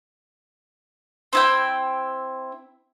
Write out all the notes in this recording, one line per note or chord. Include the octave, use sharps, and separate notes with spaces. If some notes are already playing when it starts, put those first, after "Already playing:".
C4 E4 G5